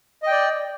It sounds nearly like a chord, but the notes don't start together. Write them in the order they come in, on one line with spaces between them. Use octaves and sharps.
D#5 G5 D5